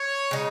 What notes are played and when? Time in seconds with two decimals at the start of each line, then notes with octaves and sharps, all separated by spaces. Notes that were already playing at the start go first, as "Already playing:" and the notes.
Already playing: C#5
0.31 C#3 G#3 D#4